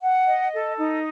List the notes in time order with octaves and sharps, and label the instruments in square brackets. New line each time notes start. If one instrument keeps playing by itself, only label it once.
[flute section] F#5
D#5
A4
D#4